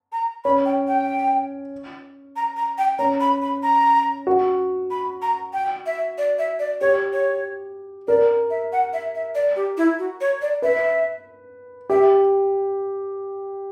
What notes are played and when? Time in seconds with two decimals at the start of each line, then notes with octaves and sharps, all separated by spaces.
0.13 A#5
0.45 C#4 B5
0.65 G5
0.87 G5
2.36 A#5
2.56 A#5
2.78 G5
2.99 C#4 A#5
3.20 B5
3.42 B5
3.63 A#5
4.27 F#4
4.91 B5
5.22 A#5
5.53 G5
5.86 E5
6.18 D5
6.39 E5
6.59 D5
6.81 G4 C#5
7.13 C#5
8.08 A#4 D5
8.50 E5
8.73 F#5
8.93 E5
9.15 E5
9.35 D5
9.56 G4
9.78 E4
9.99 F#4
10.21 C#5
10.42 D5
10.62 B4 E5
11.90 G4 E5